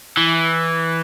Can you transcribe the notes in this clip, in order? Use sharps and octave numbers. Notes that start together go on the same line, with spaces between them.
E3